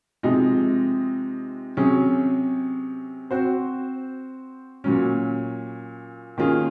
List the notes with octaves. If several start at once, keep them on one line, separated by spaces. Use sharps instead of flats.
C3 F3 G#3 D#4
C3 F#3 C#4 G#4
C4 F#4 C5
A#2 F#3 C#4
D#3 A#3 C#4 F4 G#4